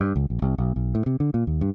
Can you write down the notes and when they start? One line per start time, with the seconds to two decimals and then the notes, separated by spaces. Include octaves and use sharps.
0.01 G2
0.16 C#2
0.30 A#1
0.42 C2
0.58 B1
0.76 B1
0.95 A2
1.06 C3
1.20 D3
1.34 A#2
1.47 D#2
1.61 G2